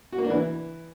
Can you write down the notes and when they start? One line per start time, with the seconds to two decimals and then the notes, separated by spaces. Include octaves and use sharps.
0.13 F#4
0.18 A#3
0.24 D4
0.30 E3